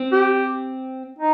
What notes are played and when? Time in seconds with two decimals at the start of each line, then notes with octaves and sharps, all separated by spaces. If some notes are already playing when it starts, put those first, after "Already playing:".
Already playing: C4
0.12 G4
1.19 D#4